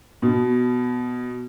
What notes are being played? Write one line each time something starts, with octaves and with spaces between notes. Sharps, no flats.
B2